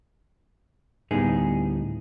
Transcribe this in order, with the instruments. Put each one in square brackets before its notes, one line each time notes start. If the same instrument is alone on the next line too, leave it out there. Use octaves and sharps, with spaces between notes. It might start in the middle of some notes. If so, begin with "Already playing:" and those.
[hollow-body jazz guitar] D2 A2 G3 B3 D#4 G#4